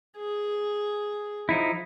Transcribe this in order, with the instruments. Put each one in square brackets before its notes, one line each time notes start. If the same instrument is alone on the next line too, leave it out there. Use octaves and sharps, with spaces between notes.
[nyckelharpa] G#4
[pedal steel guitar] F3 D#4 E4